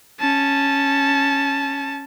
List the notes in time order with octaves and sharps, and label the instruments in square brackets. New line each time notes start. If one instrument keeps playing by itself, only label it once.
[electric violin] C#4 A5